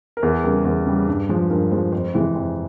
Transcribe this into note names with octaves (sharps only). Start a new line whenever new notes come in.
A#4
E2 G#4
C#3 G3 A#4
E2
C#3 G3
G2
F3 G#3
G2 A#4
F3 G#3 C5
F2 C5
C3 E3 G#3
F2